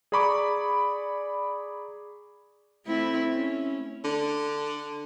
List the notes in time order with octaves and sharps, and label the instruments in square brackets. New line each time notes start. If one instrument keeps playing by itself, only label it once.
[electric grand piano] G#4 D5 A#5 B5 C#6 D6
[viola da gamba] A3 C4 E4
C#4
[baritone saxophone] D3